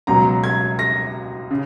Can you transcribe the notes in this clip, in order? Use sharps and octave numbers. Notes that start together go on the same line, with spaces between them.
C#2 B2 F#3 A#5
G#6
A#6
C#3